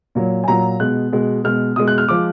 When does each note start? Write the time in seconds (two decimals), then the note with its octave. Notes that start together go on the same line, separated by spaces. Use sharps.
0.15 A#2 F#3
0.44 G#5
0.48 A#2 F#3 A#5
0.80 B2 G#3 F#6
1.12 B2 G#3
1.44 B2 G#3 F6
1.76 B2 G#3 D#6
1.88 F#6
1.98 F6
2.08 F3 G#3 D6